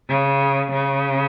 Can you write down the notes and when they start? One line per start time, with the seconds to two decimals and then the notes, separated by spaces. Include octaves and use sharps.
0.09 C#3
0.72 C#3